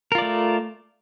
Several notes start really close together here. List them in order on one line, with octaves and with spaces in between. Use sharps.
A#4 F4 D5 A3